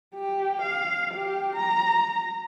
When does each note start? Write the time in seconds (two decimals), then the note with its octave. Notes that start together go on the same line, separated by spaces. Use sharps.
0.15 G4
0.62 F5
1.14 G4
1.56 A#5